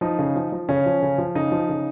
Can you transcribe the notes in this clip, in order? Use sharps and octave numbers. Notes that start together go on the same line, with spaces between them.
F3 D#4
C#3
F3
F3
C#3 C#4
F3
C#3
F3
C#3 D#4
F3
C#3